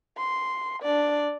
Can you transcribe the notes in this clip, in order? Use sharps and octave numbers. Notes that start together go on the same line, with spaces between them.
C6
D4 D5